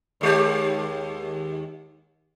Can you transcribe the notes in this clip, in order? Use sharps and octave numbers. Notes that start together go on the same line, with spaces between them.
D#2 G#3 G4